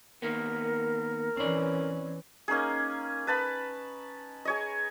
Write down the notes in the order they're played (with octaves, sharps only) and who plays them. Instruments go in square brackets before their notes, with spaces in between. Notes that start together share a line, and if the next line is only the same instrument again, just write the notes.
[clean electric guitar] D#3 A#3 B3 [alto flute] A#4
[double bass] E3 C#4 [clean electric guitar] C4 D5
[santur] A#3 C#4 D#4 G#4
B4 A5 B5
G#4 C#5 D#5